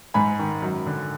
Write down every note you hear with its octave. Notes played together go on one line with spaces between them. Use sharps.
G#2 G#5 B5
D#3
F#2
D3